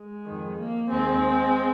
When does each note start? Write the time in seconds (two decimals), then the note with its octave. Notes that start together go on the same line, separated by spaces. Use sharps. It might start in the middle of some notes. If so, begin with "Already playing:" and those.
Already playing: G#3
0.26 F2 D#3
0.58 A#3
0.90 D#2 D#3 G#3 C4